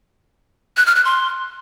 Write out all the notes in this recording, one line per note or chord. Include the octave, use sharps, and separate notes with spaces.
F#6
F6
F#6
C6